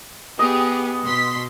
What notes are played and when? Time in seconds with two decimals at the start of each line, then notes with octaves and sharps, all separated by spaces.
0.39 B3 G4 G#4 D#5
1.05 B2 C6 B6